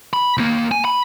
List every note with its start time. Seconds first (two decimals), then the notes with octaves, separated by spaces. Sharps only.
0.13 B5
0.38 D#2 A#3
0.72 G#5
0.85 B5